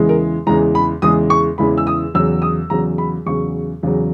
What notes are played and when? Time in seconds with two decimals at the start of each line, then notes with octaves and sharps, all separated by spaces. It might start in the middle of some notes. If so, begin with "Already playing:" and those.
Already playing: E2 C#3 E3 G#3
0.09 A#4
0.47 E2 C#3 E3 G#3 A#5
0.75 B5
1.02 E2 C#3 E3 G#3 D#6
1.30 C#6
1.58 E2 C#3 E3 G#3 B5
1.78 E6
1.87 D#6
2.14 E2 C#3 F#3 E6
2.42 D#6
2.70 E2 C#3 F#3 A#5
2.98 B5
3.26 E2 C#3 F#3 C#6
3.83 E2 C#3 F#3